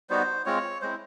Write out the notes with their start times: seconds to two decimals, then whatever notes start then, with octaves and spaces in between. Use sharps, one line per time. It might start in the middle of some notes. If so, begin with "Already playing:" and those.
0.10 G3 B3 D#4 F#4 C5
0.46 G#3 C4 F4 C#5
0.82 G#3 C4 E4 C5